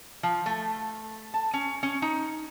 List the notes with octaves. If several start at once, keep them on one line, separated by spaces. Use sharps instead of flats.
F3
A3
A5
C#4
C#4
D#4